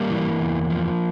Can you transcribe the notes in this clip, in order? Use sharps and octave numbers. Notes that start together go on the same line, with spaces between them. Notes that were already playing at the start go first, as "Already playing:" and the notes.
Already playing: G3 A#3
E3
E2
F3